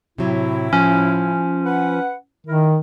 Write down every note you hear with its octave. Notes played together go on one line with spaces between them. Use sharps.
A2 C3 F#3 E4
F3 C#4
B4 F#5
D#3 E4 A#4